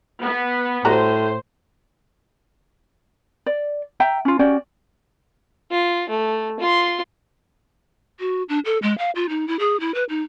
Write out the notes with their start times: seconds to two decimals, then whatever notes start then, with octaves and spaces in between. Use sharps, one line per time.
0.22 B3
0.85 A2 G3 F#4 C5 A#5
3.46 D5
4.00 E5 G5 A#5
4.25 C#4 F4
4.39 C#4 F#4 G4 D5
5.71 F4
6.09 A3
6.60 F4 C6
8.20 F#4
8.49 D4
8.65 A4
8.82 G#3
8.98 F5
9.15 F4
9.29 D#4
9.48 E4
9.59 G#4
9.80 E4
9.94 B4
10.09 D#4